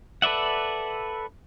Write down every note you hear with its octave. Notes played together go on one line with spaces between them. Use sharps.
A4 B4 D5 E5 F#5